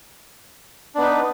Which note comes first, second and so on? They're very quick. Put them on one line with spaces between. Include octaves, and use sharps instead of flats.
D4 B3 D#4 B4